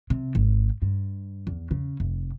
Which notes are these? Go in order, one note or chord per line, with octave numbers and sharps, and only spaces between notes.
C3
G#1
G2
E2
C#3
F1